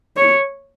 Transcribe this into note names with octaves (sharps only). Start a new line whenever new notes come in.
C#5